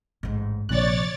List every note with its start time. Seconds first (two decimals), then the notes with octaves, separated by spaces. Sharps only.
0.23 A1 G#2
0.69 A#1 C3 F3 C#5 D5 F#6 A6